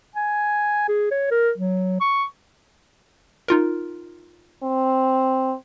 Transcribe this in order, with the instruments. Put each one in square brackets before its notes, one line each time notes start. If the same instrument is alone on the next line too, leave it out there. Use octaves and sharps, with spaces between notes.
[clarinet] G#5
G#4
C#5
A#4
F#3
C#6
[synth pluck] D#4 F4 A#4
[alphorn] C4